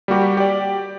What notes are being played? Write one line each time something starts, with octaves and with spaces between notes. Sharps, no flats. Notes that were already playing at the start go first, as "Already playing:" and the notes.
G3 A#3 F#4 G4
G4 D5